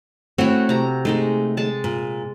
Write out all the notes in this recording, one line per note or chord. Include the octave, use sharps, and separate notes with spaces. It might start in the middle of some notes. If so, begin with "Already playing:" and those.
A3 C4 E4 F#4 C#5
C3 A#5
G#3 A3 D#4 G#4
G#3 A5
A#2